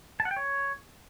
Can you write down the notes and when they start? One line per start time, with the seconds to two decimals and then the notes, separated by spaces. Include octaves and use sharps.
0.20 A5
0.25 F#5
0.31 G5
0.36 C#5